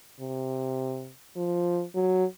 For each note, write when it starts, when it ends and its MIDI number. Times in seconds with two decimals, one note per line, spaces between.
0.20 1.12 48
1.36 1.83 53
1.95 2.24 54